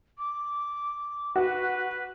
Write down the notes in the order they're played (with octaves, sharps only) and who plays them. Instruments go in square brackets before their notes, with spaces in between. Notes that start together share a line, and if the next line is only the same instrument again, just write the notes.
[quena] D6
[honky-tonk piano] F#4 [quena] B4